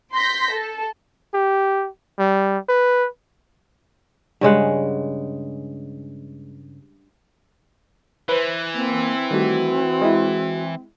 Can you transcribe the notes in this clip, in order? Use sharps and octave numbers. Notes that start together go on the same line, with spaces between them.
C6 G6 A#6 B6
A4
G4
G3
B4
G2 C#3 G#3 F#5
E3 B4 C5
A#3 C4
D#3 G3 A3 F#4
G#3 E4